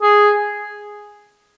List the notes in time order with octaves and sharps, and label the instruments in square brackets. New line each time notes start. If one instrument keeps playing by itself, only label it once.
[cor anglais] G#4